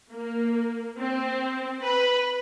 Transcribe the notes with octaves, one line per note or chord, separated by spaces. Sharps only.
A#3
C4
B4